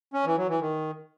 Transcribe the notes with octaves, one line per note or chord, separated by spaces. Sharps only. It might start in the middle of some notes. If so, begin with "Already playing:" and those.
C#4
E3
F#3
E3
D#3